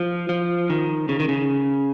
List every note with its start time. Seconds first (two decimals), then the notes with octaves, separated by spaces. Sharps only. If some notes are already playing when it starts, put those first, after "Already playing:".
Already playing: F3
0.29 F3
0.70 D#3
1.09 C#3
1.20 D#3
1.29 C#3